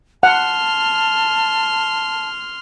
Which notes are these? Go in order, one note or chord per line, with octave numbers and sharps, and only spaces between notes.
F#5 A5 C6 F6